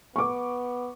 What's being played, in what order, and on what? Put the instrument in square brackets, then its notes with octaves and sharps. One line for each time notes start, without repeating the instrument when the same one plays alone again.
[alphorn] B3 [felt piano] C#6 D6